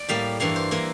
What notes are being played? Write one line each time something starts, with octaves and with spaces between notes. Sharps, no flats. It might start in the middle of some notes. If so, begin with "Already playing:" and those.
Already playing: D5
A2 G3 A#3 F5
G2 E3 A#3 F5
C5
E3 A#3 A#4